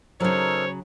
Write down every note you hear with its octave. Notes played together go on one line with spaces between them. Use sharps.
C#3 F#3 D#4 A4 A#4 C5 C#5